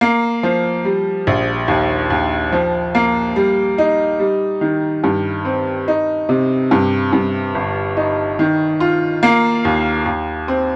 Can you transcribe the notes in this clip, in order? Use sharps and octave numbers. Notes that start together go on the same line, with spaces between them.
A#3
F3
G3
A#1
D#2
D#2
F3
A#3
G3
D#4
G3
D#3
G2
C4
D#4
C3
G2
G2
G1
D#4
D#3
F4
A#3
D#2
D#2
C4